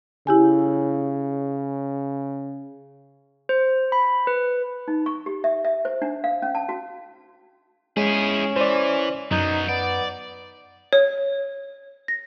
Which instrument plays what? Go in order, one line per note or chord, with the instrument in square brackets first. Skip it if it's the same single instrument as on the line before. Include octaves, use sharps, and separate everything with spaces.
[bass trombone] C#3 [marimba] E4 G4 G#5
[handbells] C5
B5
B4
[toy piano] D#4
C#6
G4
E5
E5
C5
D4
F5
C#4
A5
F#4
[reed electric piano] G#3 [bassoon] C#4 [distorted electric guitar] E4 G#4
[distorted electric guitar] E3 [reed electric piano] C5 D5
[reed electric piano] F#2 G6 [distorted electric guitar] F#3 B3 [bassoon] D#4
[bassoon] B3 [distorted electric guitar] D5
[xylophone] C#5
A#6